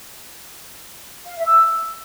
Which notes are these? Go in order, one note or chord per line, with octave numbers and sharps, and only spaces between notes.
F5
E5
E6